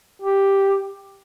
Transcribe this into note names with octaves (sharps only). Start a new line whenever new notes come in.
G4